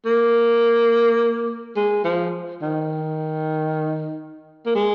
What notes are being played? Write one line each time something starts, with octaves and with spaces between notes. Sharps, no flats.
A#3
G#3
F3
D#3
A#3
G#3